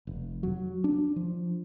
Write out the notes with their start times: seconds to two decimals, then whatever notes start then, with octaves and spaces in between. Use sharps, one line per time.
0.07 F1
0.43 F#3
0.84 D4
1.16 F3